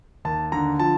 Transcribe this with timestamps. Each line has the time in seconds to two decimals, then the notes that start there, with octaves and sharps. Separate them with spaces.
0.25 D#2 A5
0.52 D3 A#5
0.80 F3 A5